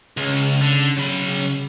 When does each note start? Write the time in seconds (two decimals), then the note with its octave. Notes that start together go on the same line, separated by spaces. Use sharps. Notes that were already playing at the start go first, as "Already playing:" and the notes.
0.17 C#2 C#3
0.61 D3
0.97 F#3 B5